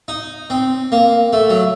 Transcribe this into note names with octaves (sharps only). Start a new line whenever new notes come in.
D#4
C4
A#3
A3
F#3